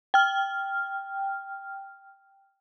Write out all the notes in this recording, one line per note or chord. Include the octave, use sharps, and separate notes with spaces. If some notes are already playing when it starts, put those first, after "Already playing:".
G5 F6